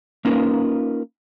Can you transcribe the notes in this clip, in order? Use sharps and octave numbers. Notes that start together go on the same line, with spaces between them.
A#3 C#4 D#4 F4 A#4 B4